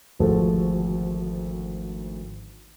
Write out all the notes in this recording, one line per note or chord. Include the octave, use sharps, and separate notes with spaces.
G#1 D2 F3 F#4 G#4 A4